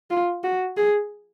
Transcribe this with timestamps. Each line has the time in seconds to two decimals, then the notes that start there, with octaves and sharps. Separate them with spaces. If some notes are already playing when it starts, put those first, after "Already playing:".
0.11 F4
0.44 F#4
0.77 G#4